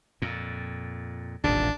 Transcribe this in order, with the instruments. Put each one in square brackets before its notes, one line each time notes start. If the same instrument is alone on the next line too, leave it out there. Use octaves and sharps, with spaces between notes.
[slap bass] F2 A#2
[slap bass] D#1 G#2 C3 [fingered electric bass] A1 [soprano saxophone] D4